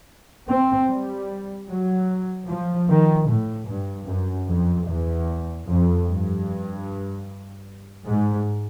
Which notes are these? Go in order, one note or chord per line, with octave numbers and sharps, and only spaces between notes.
C4
G3
F#3
F3
D#3
A2
G2
F#2
F2
E2
F2
G2
G#2